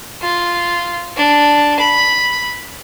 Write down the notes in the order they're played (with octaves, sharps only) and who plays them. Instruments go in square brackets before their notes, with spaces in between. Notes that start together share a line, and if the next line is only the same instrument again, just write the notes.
[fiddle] F4
D4
B5